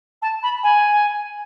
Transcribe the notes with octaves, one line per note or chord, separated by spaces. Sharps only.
A5
B5
G#5